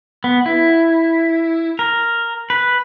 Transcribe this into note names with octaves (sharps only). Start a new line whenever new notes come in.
B3
E4
A#4
B4